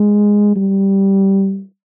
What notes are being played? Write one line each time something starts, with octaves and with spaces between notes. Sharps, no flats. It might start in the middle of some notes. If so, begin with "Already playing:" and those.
Already playing: G#3
G3